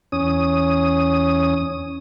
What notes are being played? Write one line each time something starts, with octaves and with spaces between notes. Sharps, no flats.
E2 C#4 D#6